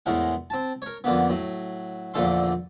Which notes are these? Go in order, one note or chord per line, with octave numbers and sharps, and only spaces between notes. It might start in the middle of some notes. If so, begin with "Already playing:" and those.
E2 A2 G#3 A#4 F#5
C4 A5
A#4 C#5
F2 D3 A#3 B3
A2 F#3
A#1 E2 A#2 D3 A4 C6